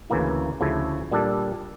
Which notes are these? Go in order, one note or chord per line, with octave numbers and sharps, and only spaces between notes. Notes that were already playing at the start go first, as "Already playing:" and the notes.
D2 C#3 E3 A#3 E4
D2 C#3 F3 A3 E4
A#2 G3 D4 A4